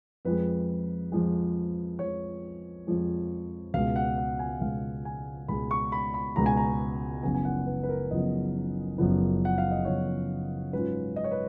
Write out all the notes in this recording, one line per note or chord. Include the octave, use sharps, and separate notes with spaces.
F2 F3 G#3 B4
F2 F3 G#3
F2 F3 G#3 C#5
F2 F3 G#3
C#2 B2 G#3 F5
F#5
F#5
G#5
C#2 B2 G#3 F5
G#5
C#2 B2 G#3 B5
C#6
B5
B5
C#2 B2 G#3 A#5
G#5
A#5
F#1 F#2 C#3 F3 B3 G#5
G#5
F#5
B4
B4
A#4
F#1 F#2 C#3 F3 B3 D#5
F#1 F#2 C#3 F3 B3
F#5
F5
D#5
F#1 F#2 C#3 F3 B3 C#5
G#2 F#3 C#4 F4 B4
D#5
C#5
B4